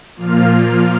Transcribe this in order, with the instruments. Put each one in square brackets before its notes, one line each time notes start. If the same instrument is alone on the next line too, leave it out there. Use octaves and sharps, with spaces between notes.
[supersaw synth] A#2 F3 A#3 F4 F6